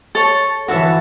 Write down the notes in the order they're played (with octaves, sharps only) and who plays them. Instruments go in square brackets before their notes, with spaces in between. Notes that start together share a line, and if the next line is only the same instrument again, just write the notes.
[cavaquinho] A4 C#5 A5
[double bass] E3 [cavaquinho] F#4 A4 E5 A5